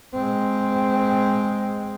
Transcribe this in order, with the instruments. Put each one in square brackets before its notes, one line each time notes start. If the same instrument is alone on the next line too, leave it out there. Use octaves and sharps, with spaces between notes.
[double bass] G#3 C4